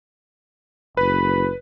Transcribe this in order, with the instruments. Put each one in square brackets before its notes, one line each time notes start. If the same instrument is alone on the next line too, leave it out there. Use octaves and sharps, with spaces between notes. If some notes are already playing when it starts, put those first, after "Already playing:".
[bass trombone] F#1 [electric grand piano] B4 [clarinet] B5